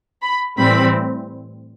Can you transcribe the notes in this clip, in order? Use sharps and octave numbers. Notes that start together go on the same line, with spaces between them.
B5
A2 E3 G3 C4 B5